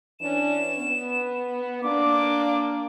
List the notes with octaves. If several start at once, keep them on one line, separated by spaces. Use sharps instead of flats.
E3 C#4 D4 E7
B3
A#3 D4 D6